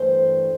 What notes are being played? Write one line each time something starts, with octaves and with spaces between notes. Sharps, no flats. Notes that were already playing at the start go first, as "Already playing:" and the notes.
Already playing: G2 E3 A3 C5